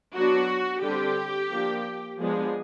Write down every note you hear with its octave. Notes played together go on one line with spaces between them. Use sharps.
F#3 B3 D4 F#4
D3 G3 C4 G4
F3 A#3 D4
F3 G#3 B3 D4 G#4